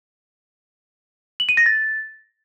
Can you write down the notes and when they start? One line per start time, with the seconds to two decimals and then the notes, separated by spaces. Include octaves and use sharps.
1.40 F#7
1.49 D#7
1.57 A#6
1.66 A6